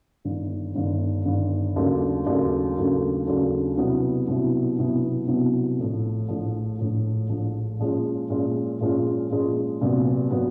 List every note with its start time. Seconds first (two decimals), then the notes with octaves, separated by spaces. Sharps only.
0.25 G1 G2 D#3
0.75 G1 G2 D#3
1.25 G1 G2 D#3
1.76 D#2 C#3 F#3 A3 D4
2.26 D#2 C#3 F#3 A3 D4
2.76 D#2 C#3 F#3 A3 D4
3.27 D#2 C#3 F#3 A3 D4
3.78 C2 B2 F#3 B3 E4
4.27 C2 B2 F#3 B3 E4
4.78 C2 B2 F#3 B3 E4
5.28 C2 B2 F#3 B3 E4
5.78 A#1 A2 F3
6.28 A#1 A2 F3
6.79 A#1 A2 F3
7.29 A#1 A2 F3
7.79 A#2 F3 G#3 C#4 F4
8.30 A#2 F3 G#3 C#4 F4
8.81 A#2 F3 G#3 C#4 F4
9.30 A#2 F3 G#3 C#4 F4
9.81 C2 A#2 F#3 B3
10.31 A#2 F#3 B3